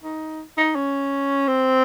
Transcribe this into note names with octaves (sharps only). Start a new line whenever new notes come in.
D#4
D#4
C#4
C4